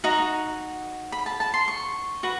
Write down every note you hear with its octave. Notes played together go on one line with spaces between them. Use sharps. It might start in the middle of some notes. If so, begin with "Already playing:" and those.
D#4 F#4
B5
A5
A5
C6
C#6
F#4 B4